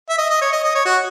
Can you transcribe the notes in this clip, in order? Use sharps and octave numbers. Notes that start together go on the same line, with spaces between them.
E5
D#5
D#5
C#5
D#5
D#5
C#5
F#4